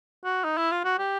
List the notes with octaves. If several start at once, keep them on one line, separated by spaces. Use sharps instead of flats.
F#4
D#4
E4
F4
F#4
G4